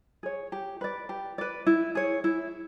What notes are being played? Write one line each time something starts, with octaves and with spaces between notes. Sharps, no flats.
G#4 C#5
G4
B4 D5
G4
B4 D5
E4
G#4 C#5
E4